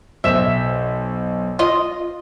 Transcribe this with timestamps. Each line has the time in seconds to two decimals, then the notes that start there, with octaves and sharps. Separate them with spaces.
0.24 B1 C5 E5 E7
1.59 F4 D#5